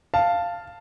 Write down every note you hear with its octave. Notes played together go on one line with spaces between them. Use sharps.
F5 A5